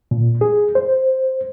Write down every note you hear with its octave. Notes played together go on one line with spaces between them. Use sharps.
A#2
G#4
C5